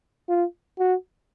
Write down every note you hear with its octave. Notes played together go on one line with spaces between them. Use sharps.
F4
F#4